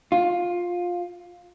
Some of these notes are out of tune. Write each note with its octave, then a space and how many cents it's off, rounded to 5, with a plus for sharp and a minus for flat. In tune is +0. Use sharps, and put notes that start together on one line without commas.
F4 +15